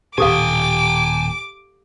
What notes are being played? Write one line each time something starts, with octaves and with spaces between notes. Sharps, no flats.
D#1 A2 G4 A4 F5 G5 G#5 D6